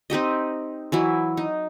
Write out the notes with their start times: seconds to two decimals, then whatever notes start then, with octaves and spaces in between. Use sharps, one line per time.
0.10 C4 D#4 G4 D#5
0.92 E3 F#3 E4
1.37 D#4